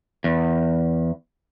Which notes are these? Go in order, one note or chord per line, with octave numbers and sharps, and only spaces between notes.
E2